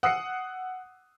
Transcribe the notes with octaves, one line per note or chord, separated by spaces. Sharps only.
F#5 D#6 E6 F#6 C7 C#7